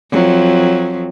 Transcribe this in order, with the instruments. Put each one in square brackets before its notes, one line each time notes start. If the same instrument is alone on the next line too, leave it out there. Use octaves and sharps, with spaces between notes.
[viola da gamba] F2 F#3